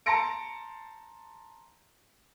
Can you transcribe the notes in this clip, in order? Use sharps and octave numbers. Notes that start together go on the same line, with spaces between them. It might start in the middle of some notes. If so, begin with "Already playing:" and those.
A5 A#5 C6 A#6 C#7 D7